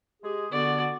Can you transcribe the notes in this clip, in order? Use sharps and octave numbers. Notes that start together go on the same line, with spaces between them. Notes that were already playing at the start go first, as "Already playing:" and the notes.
G#3 G4 G#4
D3 B3 F#4 D5